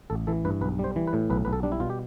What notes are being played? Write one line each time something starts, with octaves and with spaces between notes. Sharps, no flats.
A1 A4
E3 A4
G2 B4
B1 B4
G3 C5
E3
B4
A2
B1 B4
B1 B4
A4
G3 D4
E4
B2 F4
G4